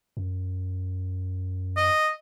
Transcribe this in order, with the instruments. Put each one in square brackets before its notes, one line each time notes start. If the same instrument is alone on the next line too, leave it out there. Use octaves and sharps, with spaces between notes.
[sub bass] F#2
[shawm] D#5